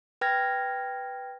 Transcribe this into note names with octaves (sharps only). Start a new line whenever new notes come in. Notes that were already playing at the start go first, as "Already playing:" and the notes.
B4 G5 F6 G#6 A#6